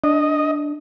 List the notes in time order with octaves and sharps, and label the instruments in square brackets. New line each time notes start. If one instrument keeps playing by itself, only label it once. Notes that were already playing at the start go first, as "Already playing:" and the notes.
[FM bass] D4 [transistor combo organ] D#5